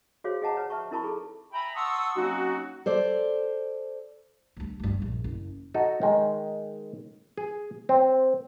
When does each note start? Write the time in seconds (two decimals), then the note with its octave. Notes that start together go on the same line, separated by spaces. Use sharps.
0.24 F#4 G#4 C5 C#5 F5
0.42 G#4 D#5 F#5 A5 A#5
0.57 B4 C#5
0.70 B4 E5 A5 C#6
0.91 D#4 E4 A#4 A5 B5 C#6
1.04 G#4 A4
1.53 E5 G5 G#5 A#5 B5
1.75 F#5 A5 C6 C#6 D#6 E6
2.16 F#3 A#3 C4 C#4 D#4 F#4
2.86 A4 C5 D5
4.57 D2 G2
4.80 D2 G2
5.02 A#1
5.24 F#1
5.74 D#4 F#4 A4
6.02 D#3 G#3
7.37 G#4
7.89 C4